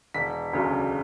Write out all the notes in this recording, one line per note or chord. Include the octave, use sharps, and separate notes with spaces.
E1 B6
D2 C#3 F#3